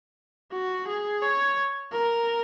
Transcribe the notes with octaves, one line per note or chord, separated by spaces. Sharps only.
F#4
G#4
C#5
A#4